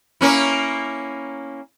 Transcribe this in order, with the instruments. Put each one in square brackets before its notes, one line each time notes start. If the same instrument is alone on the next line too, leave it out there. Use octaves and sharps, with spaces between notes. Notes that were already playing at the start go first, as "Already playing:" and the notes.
[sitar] A#3 C#4 E4